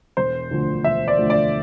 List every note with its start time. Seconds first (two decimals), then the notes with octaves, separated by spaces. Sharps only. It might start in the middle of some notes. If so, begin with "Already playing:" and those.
0.17 E1 C5
0.51 D2 D3 F3 A3
0.84 E1 E5
1.08 D5
1.18 D2 D3 F3 A3
1.30 D5